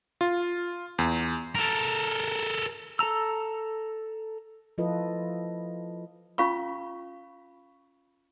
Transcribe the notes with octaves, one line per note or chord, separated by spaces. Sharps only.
F4
E2
A4 A#4
A4 A5 A#5 E6
F3 E4 F4 A4 B4 D#5
C#4 F4 F5 B5 C#6